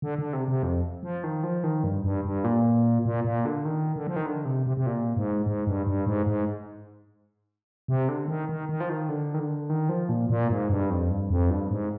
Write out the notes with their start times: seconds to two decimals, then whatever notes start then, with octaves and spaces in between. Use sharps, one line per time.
0.02 D3
0.18 D3
0.33 C3
0.48 C3
0.63 F2
1.03 F3
1.24 D#3
1.44 F3
1.64 D#3
1.84 G2
2.04 G2
2.25 G2
2.44 A#2
3.05 A#2
3.24 A#2
3.45 D3
3.65 D#3
3.96 D3
4.07 F3
4.16 D#3
4.26 D3
4.45 C3
4.67 C3
4.77 C3
4.86 A#2
5.17 G#2
5.46 G#2
5.67 G2
5.87 G2
6.06 G#2
6.26 G#2
7.88 C3
8.09 D3
8.28 D#3
8.49 D#3
8.69 D#3
8.80 F3
8.89 D#3
9.09 D3
9.34 D#3
9.40 D3
9.70 D#3
9.89 F3
10.09 A#2
10.30 A#2
10.50 G#2
10.69 G2
10.90 F2
11.11 G2
11.30 F2
11.50 G2
11.71 G#2